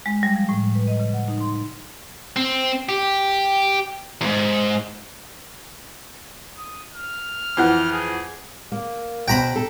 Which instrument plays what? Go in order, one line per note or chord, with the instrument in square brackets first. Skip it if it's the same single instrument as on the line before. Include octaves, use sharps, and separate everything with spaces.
[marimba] G#3
G3
F3
A2
B4
D#5
C#3
F#5
D#4
C6
[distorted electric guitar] C4
G4
E2 G#2
[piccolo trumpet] D#6
F6
[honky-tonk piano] F2 E3 F#5
[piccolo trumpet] G#4
[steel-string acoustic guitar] A#3
[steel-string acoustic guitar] B2 F#4 C5 [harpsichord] G5 A#5 B5
[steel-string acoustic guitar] A4